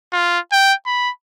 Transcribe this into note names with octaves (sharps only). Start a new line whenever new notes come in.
F4
G5
B5